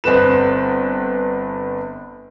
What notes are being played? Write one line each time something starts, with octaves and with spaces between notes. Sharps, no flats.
G1 C4 B4 E7